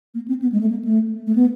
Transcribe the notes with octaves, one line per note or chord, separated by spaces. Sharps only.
A#3
C4
B3
G#3
A3
A#3
A3
A3
B3